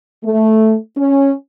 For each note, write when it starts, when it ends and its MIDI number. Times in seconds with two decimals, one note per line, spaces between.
0.24 0.74 57
0.97 1.30 61